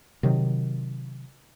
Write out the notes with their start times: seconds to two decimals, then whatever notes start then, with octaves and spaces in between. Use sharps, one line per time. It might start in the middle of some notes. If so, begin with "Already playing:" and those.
0.23 C3 D#3 F#3